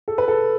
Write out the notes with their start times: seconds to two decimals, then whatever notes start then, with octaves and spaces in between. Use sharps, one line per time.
0.08 A4
0.18 B4
0.28 A4